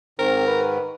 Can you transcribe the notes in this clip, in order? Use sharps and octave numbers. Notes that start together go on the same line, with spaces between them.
G#2 D#3 C4 A#4
B4